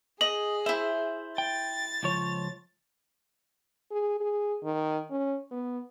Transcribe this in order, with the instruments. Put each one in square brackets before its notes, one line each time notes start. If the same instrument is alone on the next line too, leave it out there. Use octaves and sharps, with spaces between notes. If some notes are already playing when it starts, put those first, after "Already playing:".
[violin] G#4 [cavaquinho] D#5 [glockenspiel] F#7
[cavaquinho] E4 C5 [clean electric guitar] E5
[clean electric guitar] G5 [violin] A6
[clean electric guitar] C#2 F3 C#5
[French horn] G#4
G#4
D#3
C#4
B3